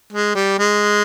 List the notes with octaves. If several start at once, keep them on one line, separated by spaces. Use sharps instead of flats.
G#3
G3
G#3